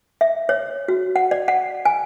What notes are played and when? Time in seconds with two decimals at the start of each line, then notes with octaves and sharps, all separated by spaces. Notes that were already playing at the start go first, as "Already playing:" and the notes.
0.21 E5
0.49 C#5
0.88 F#4
1.16 F#5
1.31 D5
1.48 F#5
1.85 G#5